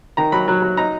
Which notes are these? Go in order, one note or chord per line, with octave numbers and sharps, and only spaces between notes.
D#3 A#5
F#3 B5
F#3
F#3
D#4 A#5